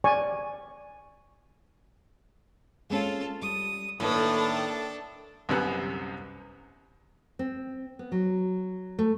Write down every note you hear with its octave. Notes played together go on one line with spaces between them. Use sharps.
D5 G#5 C#6
G#3 C4 C#4 F4 A4
G3 D#6
A2 D#3 A#3 D4 A4 B4
C2 F#2 C3 B3 F#6
C4
B3
F#3
A3